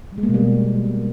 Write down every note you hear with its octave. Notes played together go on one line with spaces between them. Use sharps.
G3
G#3
A#3
B2
G3